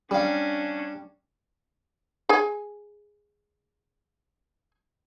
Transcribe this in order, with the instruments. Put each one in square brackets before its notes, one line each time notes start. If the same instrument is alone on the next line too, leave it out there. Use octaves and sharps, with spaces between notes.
[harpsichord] G3 F5 [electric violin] C#4 D4
[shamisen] G#4 G#5